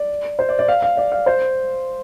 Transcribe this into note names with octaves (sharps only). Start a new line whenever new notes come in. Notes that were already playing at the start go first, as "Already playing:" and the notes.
Already playing: D5
C5
D5
D5
F5
F5
D5
F5
C5